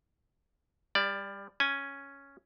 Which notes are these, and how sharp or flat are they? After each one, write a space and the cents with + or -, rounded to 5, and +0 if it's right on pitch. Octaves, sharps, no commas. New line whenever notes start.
G3 +25 D5 +0
C#4 +0 G#5 +0